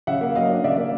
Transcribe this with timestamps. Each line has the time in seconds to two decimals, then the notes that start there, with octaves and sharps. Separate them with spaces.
0.07 C#3 E5 F#5
0.21 A#3
0.35 F#3 D#5 F5
0.50 D4
0.64 C#3 D5 E5
0.78 A#3